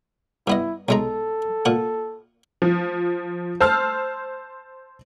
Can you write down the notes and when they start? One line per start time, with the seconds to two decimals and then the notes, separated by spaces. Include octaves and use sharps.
0.47 G2 B3 E4 D#5
0.89 B1 G#3 A4 A#5
1.65 A#2 F#5
2.62 F3
3.60 C5 A5 E6 F6